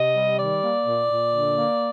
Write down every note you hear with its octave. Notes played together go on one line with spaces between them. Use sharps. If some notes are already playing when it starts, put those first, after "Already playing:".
Already playing: C3 D#5
G3
D#3 D5
A#3
A#2
A#2
D3
A#3